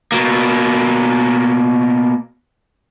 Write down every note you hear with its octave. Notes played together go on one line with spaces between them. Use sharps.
B2 A#3